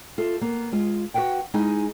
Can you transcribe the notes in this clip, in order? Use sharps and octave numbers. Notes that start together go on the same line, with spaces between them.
F4 A4 E5
A#3 B3
G#3 F4
F#4 A#4 B4 F#5 G5
G#3 D#4 E4 G#4 G#5